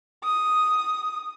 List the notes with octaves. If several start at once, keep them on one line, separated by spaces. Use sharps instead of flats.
D#6